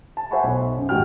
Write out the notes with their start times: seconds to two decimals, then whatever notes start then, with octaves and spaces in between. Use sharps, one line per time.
0.17 A5
0.31 C5 E5 F#5 G#5 B5 C#6
0.44 B1
0.77 F#2
0.89 D#2 G#2 F#4 G5 F6